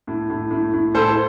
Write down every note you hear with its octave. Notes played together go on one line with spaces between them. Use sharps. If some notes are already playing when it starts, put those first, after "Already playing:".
A2
A2
A2
A2
A2 A4 C5